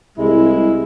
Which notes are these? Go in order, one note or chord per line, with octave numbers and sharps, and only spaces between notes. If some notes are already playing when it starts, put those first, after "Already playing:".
C2 G#3 E4